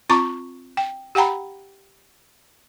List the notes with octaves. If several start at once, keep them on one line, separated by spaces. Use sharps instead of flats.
C4 F4 A#5 C#6 D6
G5
G4 F#5 G5 A#5 B5